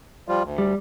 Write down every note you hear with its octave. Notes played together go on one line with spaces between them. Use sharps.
F3 G3 F4
D2
G3